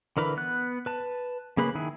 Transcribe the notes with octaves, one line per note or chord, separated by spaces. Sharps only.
D3 E3 A#4 B4 B5
B3 F#6
B4 A5
C#3 A#3 G#4 B4 B5
D#3 E4 G#4